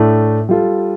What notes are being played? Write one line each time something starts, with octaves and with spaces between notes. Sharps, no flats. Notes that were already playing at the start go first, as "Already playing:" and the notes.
Already playing: A2 A3 D4
G3 F4 A4